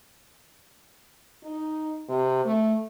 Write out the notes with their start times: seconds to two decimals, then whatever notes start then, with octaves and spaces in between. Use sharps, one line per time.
1.44 D#4
2.09 C3
2.45 A3